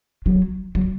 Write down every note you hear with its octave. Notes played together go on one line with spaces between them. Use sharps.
F#3
F#3